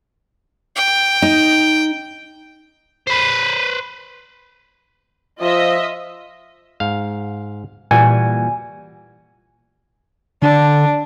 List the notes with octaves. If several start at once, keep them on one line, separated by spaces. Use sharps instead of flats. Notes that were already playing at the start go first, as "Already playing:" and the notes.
G5
D#4
B4 C5
F3 F4 D#5 E5
G#2 F5
A#2 E3 G3 F#4 G#5
D3 D4